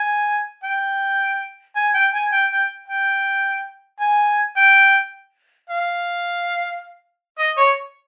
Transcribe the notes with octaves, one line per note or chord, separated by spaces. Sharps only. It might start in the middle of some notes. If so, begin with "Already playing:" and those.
Already playing: G#5
G5
G#5
G5
G#5
G5
G5
G5
G#5
G5
F5
D#5
C#5